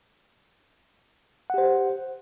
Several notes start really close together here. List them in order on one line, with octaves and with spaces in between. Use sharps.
F#5 G4 C5